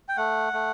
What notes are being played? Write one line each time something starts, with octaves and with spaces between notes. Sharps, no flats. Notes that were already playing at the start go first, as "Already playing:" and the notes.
G5
A3 F#5
A3